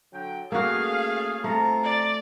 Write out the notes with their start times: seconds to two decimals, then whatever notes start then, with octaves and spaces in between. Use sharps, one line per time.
0.13 D3 F#3 G5
0.52 A3 A#3 C#4 F#4 G#4 F5
1.44 F3 A3 C4 A#5
1.84 D5